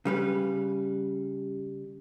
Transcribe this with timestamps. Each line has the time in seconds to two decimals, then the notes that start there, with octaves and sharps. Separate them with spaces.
0.05 C#3 G3 B4